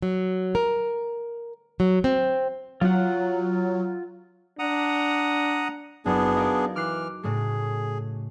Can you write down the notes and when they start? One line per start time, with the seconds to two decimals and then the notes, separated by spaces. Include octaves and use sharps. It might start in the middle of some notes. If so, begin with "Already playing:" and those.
0.02 F#3
0.55 A#4
1.80 F#3
2.04 C4
2.81 F#3 F4 F#5
4.59 D4 F#5 A#5 D#6
6.06 F#1 B3 D4 G#4
6.36 D#4 A#4 F5
6.76 E3 D6 F6 F#6 C7
7.23 A2 C#3 A3 G#4